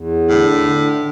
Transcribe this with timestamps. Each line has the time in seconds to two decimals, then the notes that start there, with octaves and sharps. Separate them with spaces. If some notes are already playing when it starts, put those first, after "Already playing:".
Already playing: E2
0.29 A2 D3
0.65 D3